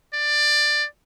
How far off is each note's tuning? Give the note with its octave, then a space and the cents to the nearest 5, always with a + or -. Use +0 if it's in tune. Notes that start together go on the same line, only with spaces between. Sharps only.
D5 +15